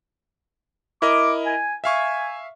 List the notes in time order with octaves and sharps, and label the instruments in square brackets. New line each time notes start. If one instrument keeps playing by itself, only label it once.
[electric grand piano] E4 A#4 D#5 [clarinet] D6
[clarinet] G#5
[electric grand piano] E5 F5 C#6 [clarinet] G#5